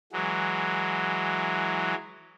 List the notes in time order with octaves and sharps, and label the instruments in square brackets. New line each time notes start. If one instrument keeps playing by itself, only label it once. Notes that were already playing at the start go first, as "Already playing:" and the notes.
[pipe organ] E3 F#3 G#3